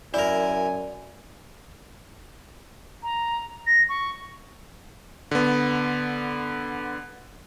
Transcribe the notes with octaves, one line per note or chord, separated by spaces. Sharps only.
F#2 E4 A#4 D5 G#5
A#5
A#6
C#6
D3 B3